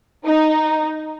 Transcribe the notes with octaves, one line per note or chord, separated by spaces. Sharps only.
D#4